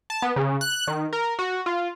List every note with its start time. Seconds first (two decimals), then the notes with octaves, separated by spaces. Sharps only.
0.10 A5
0.22 B3
0.36 C#3
0.61 F#6
0.87 D#3
1.13 A#4
1.39 F#4
1.66 F4